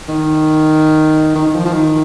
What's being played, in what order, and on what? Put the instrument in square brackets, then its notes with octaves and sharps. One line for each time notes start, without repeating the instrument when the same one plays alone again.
[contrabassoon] D#3
D#3
D#3
F3
F3
D#3